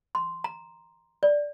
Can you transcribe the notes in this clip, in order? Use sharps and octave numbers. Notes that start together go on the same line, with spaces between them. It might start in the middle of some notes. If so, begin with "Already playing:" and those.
C6
A#5
D5